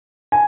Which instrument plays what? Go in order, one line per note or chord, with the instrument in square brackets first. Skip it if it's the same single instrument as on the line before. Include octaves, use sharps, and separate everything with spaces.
[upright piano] G#5